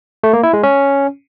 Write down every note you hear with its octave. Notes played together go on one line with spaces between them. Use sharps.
A3
A#3
E4
G#3
C#4